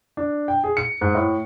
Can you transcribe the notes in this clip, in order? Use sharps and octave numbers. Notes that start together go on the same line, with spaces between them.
D4
G5
G#4
C#7
G#2
A2